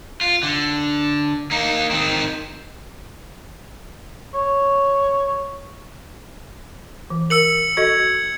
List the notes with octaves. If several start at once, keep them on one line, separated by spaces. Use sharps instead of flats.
F4
D3
A#3 D#4
D#3 C4
C#5
E3
A#4 E6 C#7 F#7
F#4 A4 D#5 G#6